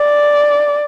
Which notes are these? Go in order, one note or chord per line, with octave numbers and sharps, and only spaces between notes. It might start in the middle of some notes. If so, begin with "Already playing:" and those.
Already playing: D5